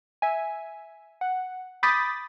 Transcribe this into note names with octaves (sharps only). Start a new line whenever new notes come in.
E5 G#5
F#5
B5 D6 D#6 G6 A6 B6